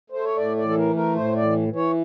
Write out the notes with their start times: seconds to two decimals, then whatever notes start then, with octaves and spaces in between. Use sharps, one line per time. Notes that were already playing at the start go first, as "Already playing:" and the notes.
0.10 A3 C5
0.24 C#5
0.37 A2 D5
0.57 D5
0.63 E3
0.69 A4
0.77 A#4
0.90 A3
0.96 A#4
1.16 A2 C5
1.36 D5
1.42 E3
1.68 E3
1.76 C#5